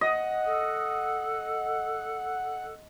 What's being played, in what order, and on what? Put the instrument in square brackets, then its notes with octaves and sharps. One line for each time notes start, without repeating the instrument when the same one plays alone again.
[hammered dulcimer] D#5 [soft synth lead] F#5
[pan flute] A4